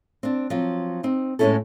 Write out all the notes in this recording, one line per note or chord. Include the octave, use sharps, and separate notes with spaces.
C4 D4
F3 F#3 C4
C4 D#4
A2 G#3 B3 C#4 E4 A4